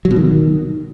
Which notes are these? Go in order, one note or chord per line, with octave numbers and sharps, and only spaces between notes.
F#3
B2
D#3